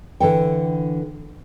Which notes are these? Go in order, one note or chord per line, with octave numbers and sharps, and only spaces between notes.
D3 E3 A4 G5